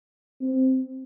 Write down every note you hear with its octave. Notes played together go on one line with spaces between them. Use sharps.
C4